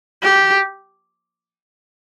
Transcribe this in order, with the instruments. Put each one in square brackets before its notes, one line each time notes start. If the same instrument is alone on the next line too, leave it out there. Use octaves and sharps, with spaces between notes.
[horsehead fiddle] G4